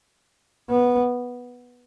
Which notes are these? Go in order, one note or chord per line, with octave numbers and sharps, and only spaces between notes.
B3